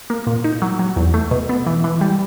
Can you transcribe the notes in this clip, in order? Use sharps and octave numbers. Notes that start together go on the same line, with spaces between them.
A#3
A#2
D#4
F#3
F#3
E2
A3
B2
B3
E3
E3
G3